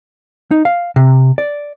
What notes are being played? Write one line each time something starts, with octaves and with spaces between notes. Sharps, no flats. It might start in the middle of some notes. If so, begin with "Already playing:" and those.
D#4
F5
C3
D5